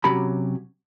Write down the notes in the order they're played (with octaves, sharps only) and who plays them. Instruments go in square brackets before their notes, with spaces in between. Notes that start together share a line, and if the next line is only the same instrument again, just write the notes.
[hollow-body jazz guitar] C3 F#3 C#4 G4 A#5 B5